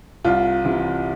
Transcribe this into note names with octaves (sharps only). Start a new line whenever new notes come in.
C2 F4
C3 E3